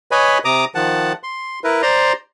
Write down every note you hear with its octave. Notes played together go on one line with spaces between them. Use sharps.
B4 C#5 D#5 G#5 B5
C3 A#5 D6 D#6
D#3 F3 F#5 A5
C6
E4 A#4 B4
C5 D5 A#5 C6